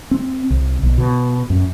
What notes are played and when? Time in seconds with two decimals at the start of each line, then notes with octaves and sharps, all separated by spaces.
0.11 C4
0.50 C2
0.83 B1
0.98 B2
1.50 F#2